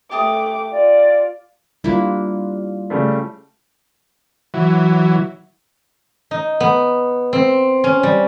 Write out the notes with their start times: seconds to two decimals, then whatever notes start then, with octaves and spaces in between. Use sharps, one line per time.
0.11 A3 G4 A5 D6 D#6
0.72 F4 D5
1.84 G3 A#3 D4 E4 F4
2.90 C#3 G3 A3
4.54 E3 F#3
6.31 D#4
6.60 B3
7.33 C4
7.84 C#4
8.03 G3